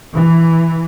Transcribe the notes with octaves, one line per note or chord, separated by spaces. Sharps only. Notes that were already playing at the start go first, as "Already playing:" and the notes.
E3